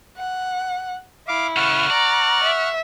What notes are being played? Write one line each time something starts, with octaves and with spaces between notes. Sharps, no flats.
F#5
E4 F5 D6
C#3 A4 F#5 C#6 F6
D5 A#5
E5